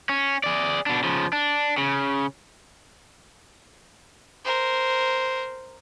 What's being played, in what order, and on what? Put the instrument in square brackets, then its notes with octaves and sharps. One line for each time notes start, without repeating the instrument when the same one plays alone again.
[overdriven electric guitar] C#4
G#4 D5
B2 D4
C#3 F3
D4
C#3
[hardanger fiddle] A#4 C5